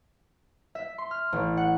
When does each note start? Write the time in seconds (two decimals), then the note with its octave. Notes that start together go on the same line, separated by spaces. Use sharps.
0.75 E5
0.98 C6
1.11 F6
1.33 A1
1.57 F#5